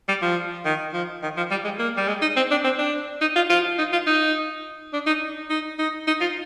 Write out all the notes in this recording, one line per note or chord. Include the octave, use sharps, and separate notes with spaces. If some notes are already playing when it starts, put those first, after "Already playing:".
G3
F3
D#3
F3
D#3
F3
G3
G#3
A#3
G3
G#3
D#4
C4
D4
C4
D4
D#4
F4
F4
D#4
F4
D#4
D4
D#4
D#4
D#4
D#4
F4